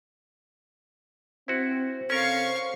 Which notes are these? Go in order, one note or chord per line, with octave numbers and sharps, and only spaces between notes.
C4 E4 F#4 C5
C3 C4 C#4 A4 A#4 F5 C#6